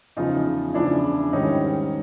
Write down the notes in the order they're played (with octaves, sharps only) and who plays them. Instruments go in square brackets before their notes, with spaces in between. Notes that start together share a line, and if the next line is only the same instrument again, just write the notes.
[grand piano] E2 C#3 F3 D#4 F4
E2 C#3 F3 D4 E4
G#2 D#3 G3 C#4 D#4